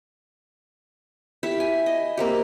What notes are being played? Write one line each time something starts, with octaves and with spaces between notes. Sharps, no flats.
E4 G4 E5
G#5
D#5
A#3 C4 G4